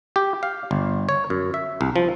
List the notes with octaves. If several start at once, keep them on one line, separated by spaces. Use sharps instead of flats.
G4
F5
G1
C#5
F#2
E5
C2
F3